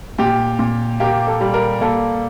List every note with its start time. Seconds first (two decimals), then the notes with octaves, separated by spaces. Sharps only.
0.18 A#2 G4
0.59 A#2
1.00 A#3 G4
1.27 A4
1.41 G3
1.54 A#4
1.81 A#3 A4